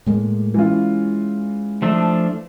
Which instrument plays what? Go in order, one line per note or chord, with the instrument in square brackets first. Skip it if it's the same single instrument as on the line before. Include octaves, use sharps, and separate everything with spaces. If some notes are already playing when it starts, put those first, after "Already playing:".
[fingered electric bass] A2 G#3 A#3
[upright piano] E3 F4 [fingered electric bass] G#3 C#4
[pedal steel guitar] F3 A3 D4